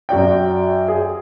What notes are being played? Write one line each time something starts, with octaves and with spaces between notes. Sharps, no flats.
F#2 F#4 D5 G5
G#4